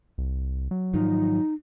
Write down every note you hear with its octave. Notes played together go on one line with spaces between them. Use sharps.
C2
F#3
G#2 D#3 F3 D#4